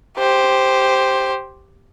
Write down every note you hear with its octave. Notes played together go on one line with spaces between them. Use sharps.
G4 C5